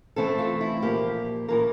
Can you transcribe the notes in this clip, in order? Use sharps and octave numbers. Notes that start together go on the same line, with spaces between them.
E3 A3 C4 A4
F4
E4
A#2 F3 A#3 G4
A2 E3 A#3 A#4